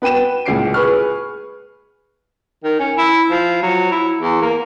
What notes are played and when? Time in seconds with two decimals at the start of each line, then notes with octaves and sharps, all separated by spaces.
0.02 B3 B4 G5 D#7 E7
0.46 D1 C#2 A#2 C7 D7
0.74 G#4 B4 C#6 F6
2.64 D#3
2.80 C#4
2.98 E4
3.30 F3
3.63 F#3
3.91 E4
4.21 E2
4.42 A#3